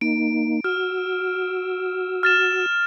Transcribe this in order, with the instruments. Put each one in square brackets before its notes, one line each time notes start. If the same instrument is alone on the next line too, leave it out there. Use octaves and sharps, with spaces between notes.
[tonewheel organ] A#3 D#4 [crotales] D7
[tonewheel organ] F#4 E6 [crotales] F6
[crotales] F6 A6 E7